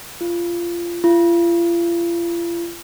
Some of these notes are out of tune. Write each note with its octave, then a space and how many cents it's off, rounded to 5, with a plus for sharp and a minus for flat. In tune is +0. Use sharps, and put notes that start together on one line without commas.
F4 -20
F4 -40